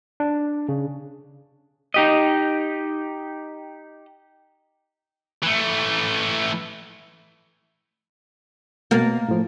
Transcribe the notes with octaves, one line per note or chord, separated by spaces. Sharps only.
D4
C#3
D#4 G4 D#5
E3 A3
B2 A#3 F6 A6
A2 F3